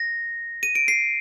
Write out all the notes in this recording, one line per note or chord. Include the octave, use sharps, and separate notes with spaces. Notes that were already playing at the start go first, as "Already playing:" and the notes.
Already playing: A#6
D#7
D7
C7